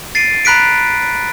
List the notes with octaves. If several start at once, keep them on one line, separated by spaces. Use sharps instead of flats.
A6 C7 D7 D#7
A#5 B5 F#6 B6 D7